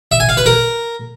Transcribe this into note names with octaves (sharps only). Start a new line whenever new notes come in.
E5
G#5
F5
B4
A#4